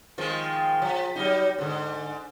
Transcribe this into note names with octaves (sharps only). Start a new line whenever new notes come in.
D#3 F3 G#3
F3
F#3 G3 D#4
G#2 D3